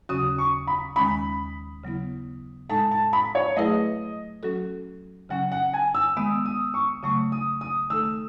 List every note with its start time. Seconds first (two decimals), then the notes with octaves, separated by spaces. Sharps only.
0.09 D#2 C#3 F#3 C#4 F#4 D#6
0.38 C#6
0.67 B5
0.96 D#2 D#3 G#3 C#4 B5
1.84 C#3 F#3 B3 E4
2.69 A2 G#3 D#4 A4 A5
2.91 A5
3.13 B5
3.35 C#5
3.56 F#3 A3 E4 G#4 B4 D#5
4.43 F#3 C#4 F#4 A4
5.29 C#3 F#3 C#4 F#5
5.52 F#5
5.73 G#5
5.95 E6
6.17 D#3 G#3 B3 D#6
6.45 D#6
6.74 C#6
7.03 C#3 F#3 A3 C#6
7.32 D#6
7.61 D#6
7.90 D#3 A3 D#4 A4 E6